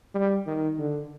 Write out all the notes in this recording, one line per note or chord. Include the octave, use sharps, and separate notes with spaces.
G3
D#3
D3